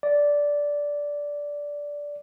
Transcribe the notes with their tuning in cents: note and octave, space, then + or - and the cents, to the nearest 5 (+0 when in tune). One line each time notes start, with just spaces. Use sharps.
D5 -10